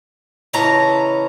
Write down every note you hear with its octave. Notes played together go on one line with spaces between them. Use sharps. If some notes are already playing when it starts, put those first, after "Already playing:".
C#3 E3 C#5 D#5 A5 A#5